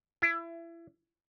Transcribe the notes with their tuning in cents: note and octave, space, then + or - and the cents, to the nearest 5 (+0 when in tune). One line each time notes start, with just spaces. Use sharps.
E4 +30